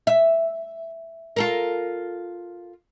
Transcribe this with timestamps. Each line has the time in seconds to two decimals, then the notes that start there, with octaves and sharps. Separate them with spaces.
0.07 E5
1.36 F4 A4 A#4